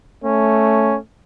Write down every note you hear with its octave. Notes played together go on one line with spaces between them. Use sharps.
A3 C#4